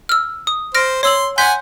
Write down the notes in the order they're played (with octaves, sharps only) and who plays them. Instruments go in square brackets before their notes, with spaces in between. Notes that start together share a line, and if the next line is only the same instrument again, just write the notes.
[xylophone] E6 F6
D#6
[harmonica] C5 [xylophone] F6 A#6 D7
[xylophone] C#5 E6 F#7 [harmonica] C6
[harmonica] F#5 G#5 [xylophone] C6 G6 B6